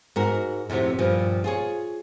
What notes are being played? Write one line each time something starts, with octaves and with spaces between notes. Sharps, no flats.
G#2 F#4 A#4
F2 A2 C3 F#4 E5
G2 A#2 F3
F4 G#4 C#5